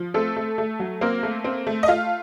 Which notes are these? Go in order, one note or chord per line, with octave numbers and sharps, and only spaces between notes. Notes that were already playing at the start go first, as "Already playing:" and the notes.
Already playing: F3
A3 C4 A4
A3
A3
F#3
A#3 C4 A#4
A3
C4
A3
D#5
A3 F4 F5